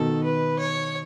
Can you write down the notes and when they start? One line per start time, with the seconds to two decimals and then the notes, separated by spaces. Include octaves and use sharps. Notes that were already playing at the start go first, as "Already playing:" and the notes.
Already playing: B2 D#3 A4
0.24 B4
0.59 C#5